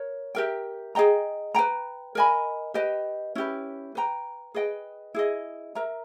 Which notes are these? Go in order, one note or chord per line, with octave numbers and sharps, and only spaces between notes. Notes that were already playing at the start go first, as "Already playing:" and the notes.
Already playing: A#4 C#5
G4 A#4 E5 G5
G#4 D#5 G5 A#5
B4 G5 A#5
A#4 D#5 G#5 B5
G4 B4 D#5 G5
C#4 E4 G4 B4
B4 G5 A#5
G#4 B4 D#5 G5
E4 G#4 D#5
A#4 E5 A#5